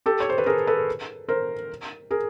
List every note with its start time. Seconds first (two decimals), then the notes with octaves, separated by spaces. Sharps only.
0.06 G4 A4
0.20 C#5
0.29 C5
0.38 B4
0.46 G#4 A#4
0.67 A4 B4
1.29 A#4 C5
2.11 G#4 A#4